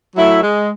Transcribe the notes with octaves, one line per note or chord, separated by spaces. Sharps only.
F#3 A3 E4
G#3